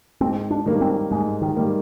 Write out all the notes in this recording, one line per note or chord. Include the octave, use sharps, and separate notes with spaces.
G#2 C4
D4
D#3 G3 A#3
C4
G#2 G#3
D#3
D#3 G3 A#3